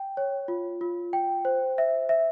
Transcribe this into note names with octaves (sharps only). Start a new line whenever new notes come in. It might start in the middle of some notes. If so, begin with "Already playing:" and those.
Already playing: G5
C#5
F4
F4
G5
C5
E5
E5